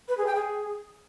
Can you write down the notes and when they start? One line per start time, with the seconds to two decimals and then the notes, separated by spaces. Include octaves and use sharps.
0.08 B4
0.17 G#4
0.26 G5
0.35 G#4